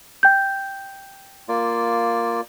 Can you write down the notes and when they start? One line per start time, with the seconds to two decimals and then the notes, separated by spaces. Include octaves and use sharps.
0.23 G5 G6
1.49 A#3 F4 D5